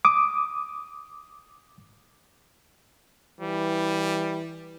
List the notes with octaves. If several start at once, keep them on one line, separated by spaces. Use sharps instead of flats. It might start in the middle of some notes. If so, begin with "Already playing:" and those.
D6 D#6
E3 G3